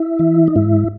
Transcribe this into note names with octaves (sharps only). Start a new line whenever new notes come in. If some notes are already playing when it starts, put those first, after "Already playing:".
Already playing: E4
E3
D#4
G#2 E4